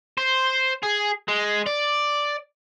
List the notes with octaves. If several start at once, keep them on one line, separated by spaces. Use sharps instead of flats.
C5
G#4
G#3
D5